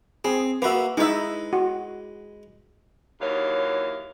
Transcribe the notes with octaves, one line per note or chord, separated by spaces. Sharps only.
C4 G#4
A#3 F#4 B4 E5
G#3 D#4 E4 B4 E5
F#4
D#2 E3 F#3 C#5 F5